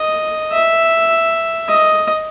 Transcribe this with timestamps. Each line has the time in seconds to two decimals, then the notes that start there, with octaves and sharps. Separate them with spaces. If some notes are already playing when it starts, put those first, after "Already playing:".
Already playing: D#5
0.52 E5
1.68 D#5